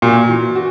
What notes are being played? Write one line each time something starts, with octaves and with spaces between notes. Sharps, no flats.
A#2 F#4
E3
F#4